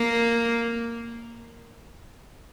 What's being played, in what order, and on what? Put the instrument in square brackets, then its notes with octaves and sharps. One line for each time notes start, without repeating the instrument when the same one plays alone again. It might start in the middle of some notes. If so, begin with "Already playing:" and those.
Already playing: [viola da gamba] A#3